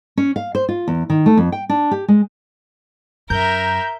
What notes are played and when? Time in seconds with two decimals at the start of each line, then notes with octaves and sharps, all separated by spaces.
0.17 C#4
0.36 F5
0.55 C5
0.69 F4
0.88 E2
1.10 D#3
1.26 A3
1.37 F2
1.52 G5
1.70 D4
1.91 G4
2.08 G#3
3.30 F#2 A#4 E5 A#5 G6